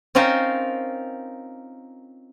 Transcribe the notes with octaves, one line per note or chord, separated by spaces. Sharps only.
C4 C#4 D#4 F4 A#4 C5